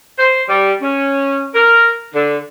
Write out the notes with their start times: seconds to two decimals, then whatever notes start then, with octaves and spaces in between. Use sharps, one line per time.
0.18 C5
0.47 G3
0.82 C#4
1.53 A#4
2.14 D3